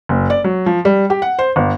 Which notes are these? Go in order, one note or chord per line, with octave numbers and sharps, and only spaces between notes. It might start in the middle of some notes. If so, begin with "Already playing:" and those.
F#1
D5
F#3
F3
G3
G4
F#5
C5
G1